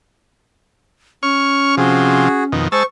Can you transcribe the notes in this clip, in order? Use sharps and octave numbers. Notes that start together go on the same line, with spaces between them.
C#4 C#5 C#6 F6
C3 F3 F#4 G#4
F2 B2 D#3
G#3 C5 A5 C#6 E6